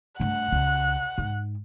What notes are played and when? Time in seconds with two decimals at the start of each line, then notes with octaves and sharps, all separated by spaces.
0.20 G2 A3 F#5
0.52 C#2
1.18 G#2